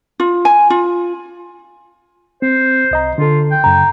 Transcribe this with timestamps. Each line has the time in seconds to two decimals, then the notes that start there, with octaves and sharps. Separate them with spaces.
0.20 F4
0.45 G#5
0.70 F4
2.42 C4 C5
2.91 C2 D#5 A#5
3.18 D3 F4 A4
3.51 G5
3.64 F#2 C#3 A#5